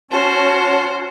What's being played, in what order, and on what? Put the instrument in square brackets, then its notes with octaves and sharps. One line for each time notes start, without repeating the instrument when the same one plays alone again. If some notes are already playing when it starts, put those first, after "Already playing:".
[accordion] C#4 A5 [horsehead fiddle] F#4 [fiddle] C5 [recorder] C#5